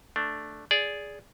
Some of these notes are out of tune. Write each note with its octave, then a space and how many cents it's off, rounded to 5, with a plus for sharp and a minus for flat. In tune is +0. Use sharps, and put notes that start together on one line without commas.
A3 +0 D4 +0
G#4 +0 D5 -15